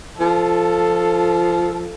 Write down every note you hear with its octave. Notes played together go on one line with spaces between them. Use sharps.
F3 A4